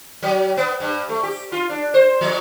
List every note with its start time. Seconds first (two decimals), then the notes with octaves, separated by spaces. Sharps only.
0.22 F#3
0.57 B3
0.80 G2
1.09 A3
1.23 G4
1.52 F4
1.69 D4
1.94 C5
2.21 F3